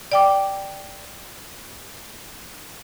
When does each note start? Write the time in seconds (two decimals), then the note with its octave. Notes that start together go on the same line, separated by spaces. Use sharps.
0.12 D5 G5 D6